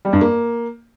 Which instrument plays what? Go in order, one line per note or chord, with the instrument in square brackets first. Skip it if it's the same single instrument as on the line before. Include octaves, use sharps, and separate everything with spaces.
[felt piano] G3
G2
A#3